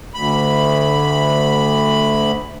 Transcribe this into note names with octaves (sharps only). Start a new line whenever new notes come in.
D2 B5